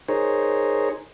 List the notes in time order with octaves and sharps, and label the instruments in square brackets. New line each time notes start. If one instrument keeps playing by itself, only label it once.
[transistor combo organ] D#4 G#4 A#4 C5 C#5